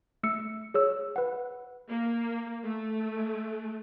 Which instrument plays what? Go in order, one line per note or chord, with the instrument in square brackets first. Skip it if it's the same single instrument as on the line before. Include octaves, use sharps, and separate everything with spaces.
[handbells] A3 E6 C#7
G#4 C#5 E6
B4 F#5
[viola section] A#3
A3